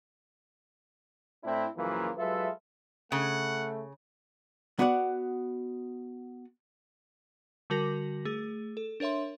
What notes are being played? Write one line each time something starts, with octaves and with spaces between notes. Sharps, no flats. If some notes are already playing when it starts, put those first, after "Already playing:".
A2 C4 D4 E4
F#2 C#3 E3 F3 A#3
F#3 G#3 F4 A4 B4 E5
C#3 A3 F#5
B3 F#4 D5 F#5
D3 G3 F#4 A#4 A#6
A3 G#4
A4
D4 A#4 C#5 E5 C6